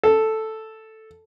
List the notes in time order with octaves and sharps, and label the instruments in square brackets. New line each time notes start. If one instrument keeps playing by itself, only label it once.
[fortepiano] A4